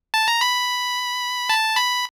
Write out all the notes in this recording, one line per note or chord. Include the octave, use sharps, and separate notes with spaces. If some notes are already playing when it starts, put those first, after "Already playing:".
A5
A#5
B5
A5
B5